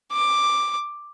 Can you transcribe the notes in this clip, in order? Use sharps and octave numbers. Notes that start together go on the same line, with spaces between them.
D6